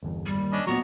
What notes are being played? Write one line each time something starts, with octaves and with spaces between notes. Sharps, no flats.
G1 E2
G3
D#2
C#4 D4 D#5
A#2 F#3 B3 A#5 C#6